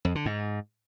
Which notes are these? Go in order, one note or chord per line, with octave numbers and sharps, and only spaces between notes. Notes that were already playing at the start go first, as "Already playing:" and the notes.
F2
D3
G#2